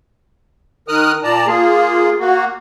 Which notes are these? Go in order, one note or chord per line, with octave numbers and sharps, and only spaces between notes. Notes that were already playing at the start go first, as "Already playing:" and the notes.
D#3 A#4 D#6 F6 F#6
A#2 D5 A5 A#5
A#3 F4 G#4
A#3 F#4